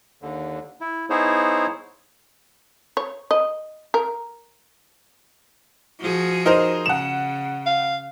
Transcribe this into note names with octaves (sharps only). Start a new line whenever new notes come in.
D#2 D3
E4
B3 D#4 E4 G#4 C5 C#5
C#5
D#5
A#4
F3 F#4 G#4
D#4 A#4 C5
C#3 F#5 E7
F5